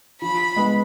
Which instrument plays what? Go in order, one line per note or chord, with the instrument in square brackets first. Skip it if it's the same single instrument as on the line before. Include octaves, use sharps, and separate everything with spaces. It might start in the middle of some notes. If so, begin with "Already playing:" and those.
[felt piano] F3 [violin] B5
[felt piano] G#3 B3